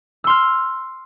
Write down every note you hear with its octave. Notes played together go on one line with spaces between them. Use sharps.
C6 E6 F6